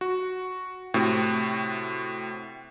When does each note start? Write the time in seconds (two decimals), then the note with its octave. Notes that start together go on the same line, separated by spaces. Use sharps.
0.01 F#4
0.94 A2 C3 C4 F#4